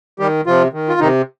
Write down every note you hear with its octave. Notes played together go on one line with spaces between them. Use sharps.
D#3 G3 G4
C3 F3 F4
D#3
F4
C3 D#3 D#4